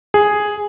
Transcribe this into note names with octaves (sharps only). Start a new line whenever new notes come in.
G#4